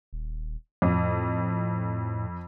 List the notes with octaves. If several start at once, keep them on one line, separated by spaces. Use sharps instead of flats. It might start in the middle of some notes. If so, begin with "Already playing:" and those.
D#1
F2 A2